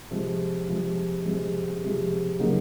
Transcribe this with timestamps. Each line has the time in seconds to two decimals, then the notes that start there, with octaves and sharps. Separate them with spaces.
0.11 C3 F3 G#3
0.68 C3 F3 G#3
1.25 C3 F3 G#3
1.82 C3 F3 G#3
2.39 C#3 F#3 A#3 D#4